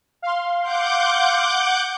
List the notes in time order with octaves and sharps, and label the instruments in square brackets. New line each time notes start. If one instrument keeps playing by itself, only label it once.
[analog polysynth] F5 C6
[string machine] F#5 D6 G6